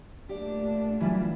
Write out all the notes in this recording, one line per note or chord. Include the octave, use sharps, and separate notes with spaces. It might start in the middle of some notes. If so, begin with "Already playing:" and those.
A#2 A3 D4 G4 D5
E3 F#3 G3 E4 F4